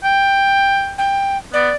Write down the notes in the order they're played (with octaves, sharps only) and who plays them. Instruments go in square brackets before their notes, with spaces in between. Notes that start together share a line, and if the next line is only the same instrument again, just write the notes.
[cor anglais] G5
[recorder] G5
[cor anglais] B3 [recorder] D5